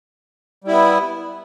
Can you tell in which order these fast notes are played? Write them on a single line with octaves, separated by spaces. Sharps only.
G3 E4 B3